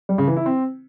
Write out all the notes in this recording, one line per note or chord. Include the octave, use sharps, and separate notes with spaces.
G3
C#3
E3
E4
C4